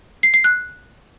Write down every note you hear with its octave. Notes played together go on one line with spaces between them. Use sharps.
C7
C7
F#6